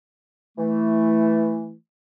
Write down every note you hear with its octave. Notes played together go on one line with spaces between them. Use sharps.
E3 A3